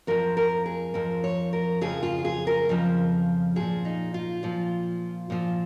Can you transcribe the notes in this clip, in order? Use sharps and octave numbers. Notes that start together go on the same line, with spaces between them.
F2 F3 A#4
A#4
G#4
F2 F3 A#4
C#5
A#4
F2 C#3 F3 G#4
F4
G#4
A#4
F2 C#3 F3
A#2 F3 G#4
D#4
F4
A#2 F3
A#2 F3